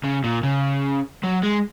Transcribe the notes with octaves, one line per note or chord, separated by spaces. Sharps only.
C#3
A#2
C#3
F#3
G#3